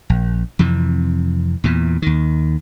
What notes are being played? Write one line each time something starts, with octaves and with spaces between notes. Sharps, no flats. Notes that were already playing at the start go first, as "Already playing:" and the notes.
A#1
F2 C3 E3
E2 A#2 E3
D#2 D#3